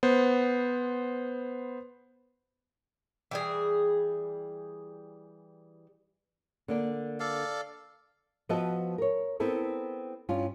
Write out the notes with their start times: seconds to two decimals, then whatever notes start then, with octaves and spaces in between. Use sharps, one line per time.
0.03 B3 C5
3.31 E3 G3 G#4
6.68 D3 A#3 D4
7.20 A4 D5 F5
8.49 F3 B3 F#4 D#5 E5 A5
8.98 A#4 C#5
9.40 B3 C4 E4 A4 A#4
10.29 G2 C#4 F4